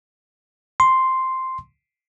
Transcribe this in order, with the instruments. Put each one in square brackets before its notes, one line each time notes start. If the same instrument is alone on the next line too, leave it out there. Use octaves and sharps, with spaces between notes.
[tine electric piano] C6